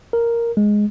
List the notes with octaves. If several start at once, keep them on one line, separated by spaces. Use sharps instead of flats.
A#4
G#3